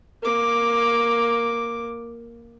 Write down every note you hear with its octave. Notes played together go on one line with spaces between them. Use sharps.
A#3 D6